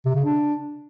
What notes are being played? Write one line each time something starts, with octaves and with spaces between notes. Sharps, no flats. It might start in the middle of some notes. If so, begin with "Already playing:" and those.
C3
C#3
D4